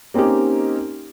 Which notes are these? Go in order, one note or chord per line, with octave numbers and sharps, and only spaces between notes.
A#3 C4 C#4 D#4 G4